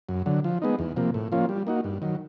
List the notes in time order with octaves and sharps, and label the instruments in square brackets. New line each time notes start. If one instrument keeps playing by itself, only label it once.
[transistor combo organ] F#2
D3 F#3
F3
G#3 B3 D#4
E2
C3 F3 A#3
A2
F3 A#3 C#4 F4
G3
A#3 D#4 F#4
G2
D#3 F#3